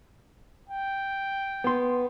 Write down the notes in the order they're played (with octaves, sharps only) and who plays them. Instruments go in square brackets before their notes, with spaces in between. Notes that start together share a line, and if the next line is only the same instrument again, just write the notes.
[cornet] G5
[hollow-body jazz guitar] B3 C6